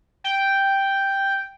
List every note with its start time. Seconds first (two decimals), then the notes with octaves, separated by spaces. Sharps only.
0.24 G5